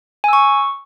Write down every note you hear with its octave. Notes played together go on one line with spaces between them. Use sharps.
G#5 C#6 E6